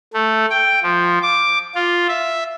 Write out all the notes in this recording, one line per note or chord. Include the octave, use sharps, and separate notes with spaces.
A3
G5
F3
D6
F4
E5